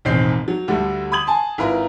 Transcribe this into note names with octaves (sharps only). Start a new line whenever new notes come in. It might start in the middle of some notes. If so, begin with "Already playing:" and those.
E1 A1 D#3 C4 G6 C7
F#3
D2 D3 G3 A3
B5 D#6 G#6 F#7
G#5 A5 C6
G#1 E4 F4 A#4 B4 A#5